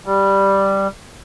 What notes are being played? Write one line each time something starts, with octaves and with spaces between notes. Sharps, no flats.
G3